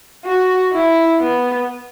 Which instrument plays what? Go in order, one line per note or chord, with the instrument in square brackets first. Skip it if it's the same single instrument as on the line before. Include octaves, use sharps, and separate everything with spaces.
[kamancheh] F#4
E4
B3